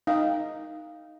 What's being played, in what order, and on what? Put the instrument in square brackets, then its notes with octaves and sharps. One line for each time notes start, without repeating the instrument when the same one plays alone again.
[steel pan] D#4 [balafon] F5